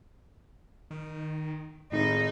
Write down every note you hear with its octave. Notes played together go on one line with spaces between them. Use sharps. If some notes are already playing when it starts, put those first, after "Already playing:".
D#3
G#1 A2 D#4